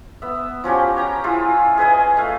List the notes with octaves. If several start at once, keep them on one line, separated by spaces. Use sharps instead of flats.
B3 E5
F3 C#4 F#4 G4
C#5 G5 A#5
E4 F4 G#4
G#4 B4 D#5 G#5
A3 F5